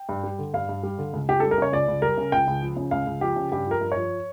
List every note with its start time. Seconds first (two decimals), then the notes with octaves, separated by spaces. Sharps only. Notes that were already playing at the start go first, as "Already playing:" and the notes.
Already playing: G5
0.09 G2
0.24 G3
0.39 D3
0.54 G2 F5
0.69 G2
0.83 G3
0.98 D3
1.13 C#2
1.29 C#2 G4
1.40 G3 A4
1.51 A#4
1.58 C#3 C#5
1.72 C#2 D5
1.88 C#2
2.02 G3 A#4
2.18 C#3
2.32 C#2 G5
2.47 C#2
2.62 F3
2.77 C#3
2.91 C#2 F5
3.07 C#2
3.21 F3 G4
3.36 C#3
3.52 G2 G4
3.66 F3 A#4
3.81 G2
3.92 F3 C#5